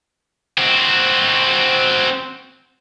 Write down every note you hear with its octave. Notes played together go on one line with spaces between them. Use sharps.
C4 F#4